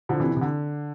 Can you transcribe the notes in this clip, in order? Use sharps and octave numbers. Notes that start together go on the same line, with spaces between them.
D3 F3
C3 E3
C3
E3
D3